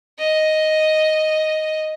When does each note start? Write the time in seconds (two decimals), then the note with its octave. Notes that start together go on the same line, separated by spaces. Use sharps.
0.19 D#5